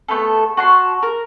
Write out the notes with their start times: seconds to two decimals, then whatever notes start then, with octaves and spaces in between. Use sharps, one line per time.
0.08 A3 B3 A4
0.57 F#4 A5 C6
1.03 A#4